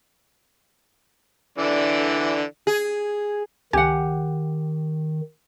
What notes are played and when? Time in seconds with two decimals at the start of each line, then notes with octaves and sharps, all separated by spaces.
1.58 D3 E3 D5
2.67 G#4
3.73 C#2 D#3 G4 F#5 G#5